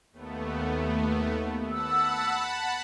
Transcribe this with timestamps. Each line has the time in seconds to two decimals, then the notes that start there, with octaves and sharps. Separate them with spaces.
0.12 D#2 A3 B3
1.71 F#5 A5 B5 E6